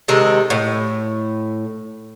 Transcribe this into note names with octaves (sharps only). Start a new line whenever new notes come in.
C3 D#3 G#3 A4
A2